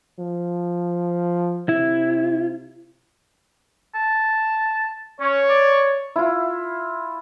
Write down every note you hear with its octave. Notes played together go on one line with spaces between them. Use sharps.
F3
C3 E4
A5
C#4 C#5
D5
E4 F4